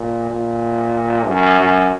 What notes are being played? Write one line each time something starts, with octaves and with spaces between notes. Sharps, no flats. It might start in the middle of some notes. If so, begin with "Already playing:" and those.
Already playing: A#2
A#2
F#2
F#2